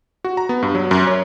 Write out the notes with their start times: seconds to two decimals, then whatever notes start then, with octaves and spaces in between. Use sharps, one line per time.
0.24 F#4
0.37 A#5
0.49 B3
0.63 G2
0.75 F#3
0.91 F#2
1.07 C#5